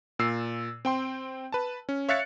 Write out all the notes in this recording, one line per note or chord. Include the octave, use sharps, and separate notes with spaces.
A#2 E6 C7
C4 G5 C6
B4 A5
C#4
C#5 E5 F5 F#6 A6 C#7